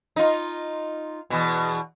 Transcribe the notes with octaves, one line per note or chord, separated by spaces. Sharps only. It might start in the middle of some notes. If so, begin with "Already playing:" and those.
D#4 F4
E2 B2